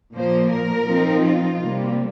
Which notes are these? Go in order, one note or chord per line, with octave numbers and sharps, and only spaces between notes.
A#2 F3 A#3 C5
A#4
F3 C4 D#4
F4
C3 G3 A#3